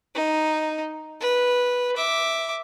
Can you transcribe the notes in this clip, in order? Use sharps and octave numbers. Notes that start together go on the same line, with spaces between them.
D#4
B4
E5 D6